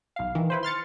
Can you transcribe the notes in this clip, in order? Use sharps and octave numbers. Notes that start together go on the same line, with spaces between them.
B1 F5
D#3 E3
E4 B4 C5
C6 F6 A6 C#7